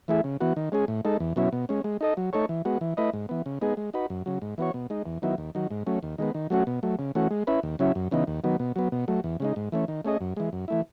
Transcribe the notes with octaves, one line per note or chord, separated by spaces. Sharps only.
E3 A3 E4 G#4
C#3
E3 B3 F#4
D#3
G#3 C#4 G#4
A2
G#3 D#4 A4
E2
B2 F#3 C#4 E4
B2
G#3 C#4
G#3
D#4 A4 D#5
F#3
A3 D#4 A4 C#5
E3
G#3 B3 F#4
E3
A3 E4 B4 D#5
G#2
E3 B3
C#3
G#3 B3 D#4 G#4
G#3
D#4 F#4 B4
F#2
C#3 F#3
G#2
E3 B3 F#4 C#5
B2
G#3 D#4
E2
D#3 F#3 B3 E4
D#2
D#3 F#3
G#2
F#3 A3 C#4
D#2
D#3 G#3 B3
D#3
F#3 A3 C#4 F#4
B2
F#3 A3
C#3
E3 A3 C#4 F#4
G#3
C#4 E4 B4
D#2
C#3 F#3 C#4 E4
F#2
C#3 E3 B3 D#4
D#2
D#3 F#3 B3
B2
F#3 B3
B2
F#3 A3
E2
C#3 G#3 D#4
G#2
E3 A3 C#4
D#3
A3 C#4 G#4 D#5
F#2
E3 G#3
F#2
E3 A3 E4